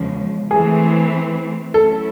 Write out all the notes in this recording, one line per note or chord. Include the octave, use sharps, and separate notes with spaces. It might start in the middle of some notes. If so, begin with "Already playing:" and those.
Already playing: E2 C#3 F3 G#3
E3 A3 C4 G#4
F#3 A3 C#4 E4 A4